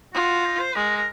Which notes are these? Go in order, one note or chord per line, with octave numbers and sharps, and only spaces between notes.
F4 F#4
D#4
C5
G#3 A#4
A#4